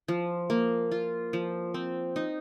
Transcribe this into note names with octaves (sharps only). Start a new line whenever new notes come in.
F3
A#3
F4
F3
C4
D#4